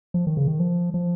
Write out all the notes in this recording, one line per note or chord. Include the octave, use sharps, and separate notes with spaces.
F3
D#3
C#3
D#3
F3
F3